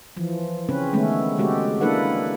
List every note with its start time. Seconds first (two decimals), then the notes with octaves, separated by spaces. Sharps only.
0.17 E3 F3
0.69 C#3 C4 C#4 B4
0.93 D#3 G#3 A3 B3 C#4
1.38 C#3 G#3 C4 F#4 G4 A4
1.81 A#3 D4 E4 A4 B4 F#5